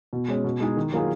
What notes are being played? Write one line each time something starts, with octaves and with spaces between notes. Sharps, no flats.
B2
G#3 C#4
B2
G#3 D#4 G#4
D#3
F#3 A#3 F4 G#4